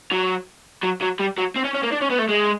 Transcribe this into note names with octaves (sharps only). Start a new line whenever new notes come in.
F#3
F#3
F#3
G3
F#3
C4
C#4
C#4
A#3
D4
C#4
B3
A3
G#3